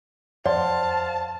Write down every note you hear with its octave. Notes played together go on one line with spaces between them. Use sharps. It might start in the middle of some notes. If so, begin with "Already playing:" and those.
F2 C5 D5 F5 F#5 A5 C6